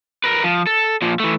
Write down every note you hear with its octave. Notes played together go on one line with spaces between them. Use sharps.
A#4 B4
F3
A4
A#2 F3
E3 A3